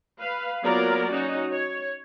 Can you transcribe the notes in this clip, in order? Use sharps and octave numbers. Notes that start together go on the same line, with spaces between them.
B4 F5
F#3 A#3 B3 F4 A#4 D5
C#4 D#4 F#4
C#5